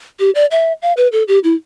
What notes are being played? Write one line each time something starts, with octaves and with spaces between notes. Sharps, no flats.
G4
D5
E5
F5
B4
A4
G4
E4